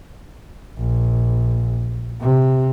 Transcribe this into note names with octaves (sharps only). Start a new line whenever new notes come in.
A#1
C3